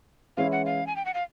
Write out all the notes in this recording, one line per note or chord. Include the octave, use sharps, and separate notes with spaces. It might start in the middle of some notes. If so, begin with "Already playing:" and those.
E3 G#3 C#4 E4 F5
F#5
F5
G#5
G5
F#5
F5